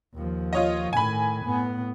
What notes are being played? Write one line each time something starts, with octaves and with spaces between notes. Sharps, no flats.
D#2 F3
F4 C#5 D#5
A2 D#3 G#5 B5
A2 B3